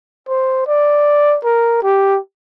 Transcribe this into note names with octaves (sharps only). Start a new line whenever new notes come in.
C5
D5
A#4
G4